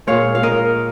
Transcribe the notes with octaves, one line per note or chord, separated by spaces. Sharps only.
A#2 G#3 C#5 F5
F5
A#4 D#5